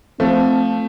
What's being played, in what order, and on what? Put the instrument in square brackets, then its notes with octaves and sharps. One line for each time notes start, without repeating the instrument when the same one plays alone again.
[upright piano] F3 A3 [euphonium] C4